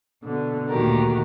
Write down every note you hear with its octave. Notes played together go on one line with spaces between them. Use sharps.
B2 D3
D2 A#2 D#3 F#4 G4 A#4